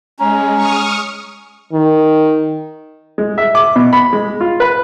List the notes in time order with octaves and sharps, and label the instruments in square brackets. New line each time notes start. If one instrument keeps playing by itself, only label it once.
[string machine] G#3 [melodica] C#4 [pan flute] A#5
[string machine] C#6 D#6 F6
[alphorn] D#3
[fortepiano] G#3
E5
D6
B2
B5
G#3
F4
B4